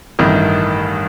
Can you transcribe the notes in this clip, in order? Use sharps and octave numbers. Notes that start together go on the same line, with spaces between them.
A1 G2 D#3 A3